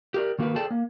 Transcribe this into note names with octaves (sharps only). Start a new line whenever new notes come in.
G4 A#4 D5
D#3 A#3 F#4 A#4 B4
G#4 A4 C5 D5 G5 A5
A#3